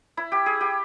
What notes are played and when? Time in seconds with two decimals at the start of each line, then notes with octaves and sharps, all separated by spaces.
0.17 E4
0.32 G4
0.46 G#4
0.61 G4